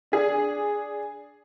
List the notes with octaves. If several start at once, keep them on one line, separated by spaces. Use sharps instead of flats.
D4 G#4